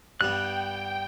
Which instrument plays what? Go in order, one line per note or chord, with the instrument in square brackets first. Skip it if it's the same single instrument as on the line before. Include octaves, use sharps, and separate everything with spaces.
[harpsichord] G2 G3 B3 [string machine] G5 [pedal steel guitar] F#6